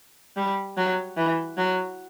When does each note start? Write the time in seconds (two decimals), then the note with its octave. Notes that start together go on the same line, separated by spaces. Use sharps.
0.37 G3
0.77 F#3
1.17 E3
1.57 F#3